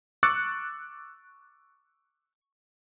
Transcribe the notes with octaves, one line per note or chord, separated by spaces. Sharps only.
C#6 D6 E6 F#6 A6 C#7